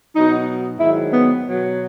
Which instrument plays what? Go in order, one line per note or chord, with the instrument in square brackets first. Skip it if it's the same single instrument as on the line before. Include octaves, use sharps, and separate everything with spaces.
[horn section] B2 F#3 D#4
G#2 D#3 F#3 E4
B3
B2 F#3